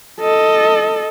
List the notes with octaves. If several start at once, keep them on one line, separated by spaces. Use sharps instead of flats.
A4 D#5